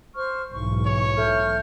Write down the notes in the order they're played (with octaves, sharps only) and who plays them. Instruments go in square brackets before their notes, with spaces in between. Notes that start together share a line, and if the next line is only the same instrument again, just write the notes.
[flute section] C5 C#6 F6
[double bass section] B1 G#2 E3 [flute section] C#6
[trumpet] C#5
[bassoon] A3 [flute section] F6 G6